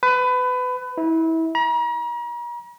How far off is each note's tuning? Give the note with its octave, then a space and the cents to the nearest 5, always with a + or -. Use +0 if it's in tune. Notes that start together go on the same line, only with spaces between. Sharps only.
B4 +25
E4 -25
A#5 +40